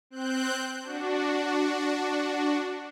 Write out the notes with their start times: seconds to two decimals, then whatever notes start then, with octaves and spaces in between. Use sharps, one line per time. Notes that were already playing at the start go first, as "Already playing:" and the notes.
0.10 C4 F#6 G6
0.83 D4 F#4